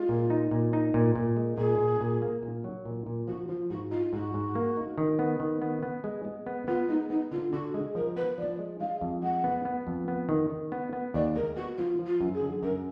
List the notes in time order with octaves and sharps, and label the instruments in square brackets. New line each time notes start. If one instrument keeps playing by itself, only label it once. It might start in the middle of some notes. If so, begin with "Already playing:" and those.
Already playing: [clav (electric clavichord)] G#3 [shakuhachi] F4
[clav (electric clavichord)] A#2
D#4
A#2
D#4
A#2
A#2
G#3
[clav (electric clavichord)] A#2 [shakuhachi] G#4
[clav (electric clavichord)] A#2
A#2
A#3
A#2
F#3
A#2
A#2
[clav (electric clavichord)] F3 [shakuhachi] F#4
[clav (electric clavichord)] F3 [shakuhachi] F4
[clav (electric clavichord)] G#2 [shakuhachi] F#4
[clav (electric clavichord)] D#4 [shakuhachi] F4
[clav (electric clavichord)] G#2 [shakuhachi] F#4
[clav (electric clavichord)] G#2
A#3
D#4
D#3
B3
D#3
B3
B3
G#3
G#3
B3
[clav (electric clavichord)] B3 [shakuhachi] F4
[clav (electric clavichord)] G#3 [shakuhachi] D#4
[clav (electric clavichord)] B3 [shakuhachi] D#4
[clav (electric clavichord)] D3 [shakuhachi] F4
[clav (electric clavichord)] D3 [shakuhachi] F#4
[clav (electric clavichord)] G#3 [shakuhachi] G#4
[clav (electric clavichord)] F3 [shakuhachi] A#4
[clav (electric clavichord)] B3 [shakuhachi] B4
[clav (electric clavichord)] F3 [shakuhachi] D5
[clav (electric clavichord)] G#3
[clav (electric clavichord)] G#3 [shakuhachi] F5
[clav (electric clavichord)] F2
[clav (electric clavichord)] G#3 [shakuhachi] F#5
[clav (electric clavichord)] B3
B3
F2
B3
D#3
D#3
B3
B3
[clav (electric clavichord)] D#2 [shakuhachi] D5
[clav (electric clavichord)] G#3 [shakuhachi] A#4
[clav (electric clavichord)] B3 [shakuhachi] F#4
[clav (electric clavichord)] F3 [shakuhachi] F4
[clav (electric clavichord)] F3
[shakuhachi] F4
[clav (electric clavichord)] F#2
[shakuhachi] G#4
[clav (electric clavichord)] D3
[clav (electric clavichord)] F#2 [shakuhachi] A#4